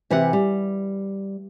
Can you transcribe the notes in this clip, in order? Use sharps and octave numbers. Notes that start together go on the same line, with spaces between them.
C3 E3 G4 F#5
G3